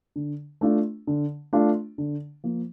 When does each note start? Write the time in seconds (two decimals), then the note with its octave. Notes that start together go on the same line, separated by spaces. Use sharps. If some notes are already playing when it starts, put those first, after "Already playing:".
0.16 D3
0.61 A3 D4 F4
1.07 D3
1.53 A3 D4 F4
1.98 D3
2.44 F3 A#3